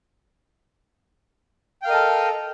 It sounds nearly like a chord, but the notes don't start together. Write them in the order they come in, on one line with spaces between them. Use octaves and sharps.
G5 F5 A#4 D#5 A4